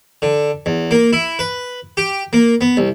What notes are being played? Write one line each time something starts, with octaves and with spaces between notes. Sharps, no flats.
D3
E2
A#3
E4
B4
G4
A#3
B3
C2